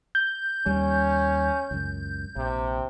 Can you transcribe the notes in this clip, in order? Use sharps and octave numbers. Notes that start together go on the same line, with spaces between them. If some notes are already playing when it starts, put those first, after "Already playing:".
G6
D#2 G3 C#4
C#2 F#2
A#1 C3